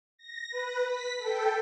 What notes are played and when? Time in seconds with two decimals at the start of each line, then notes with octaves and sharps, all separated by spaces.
0.18 A#6
0.51 B4
0.86 B6
1.18 A4 G5